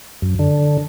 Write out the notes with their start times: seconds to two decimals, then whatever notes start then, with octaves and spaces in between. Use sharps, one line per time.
0.22 F#2
0.39 D3